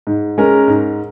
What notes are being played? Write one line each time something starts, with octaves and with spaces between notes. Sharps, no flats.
G#2
G#3 C#4 A#4
G#2